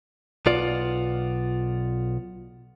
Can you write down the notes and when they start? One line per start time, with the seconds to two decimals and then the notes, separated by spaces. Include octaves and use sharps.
0.46 B1 B3 F4 D5